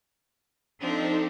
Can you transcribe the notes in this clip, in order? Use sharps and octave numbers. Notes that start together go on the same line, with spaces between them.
F3 C4 D4 D#4 A4